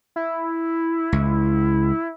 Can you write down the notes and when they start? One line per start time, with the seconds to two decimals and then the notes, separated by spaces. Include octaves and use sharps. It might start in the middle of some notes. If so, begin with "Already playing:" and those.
0.16 E4
1.12 C#2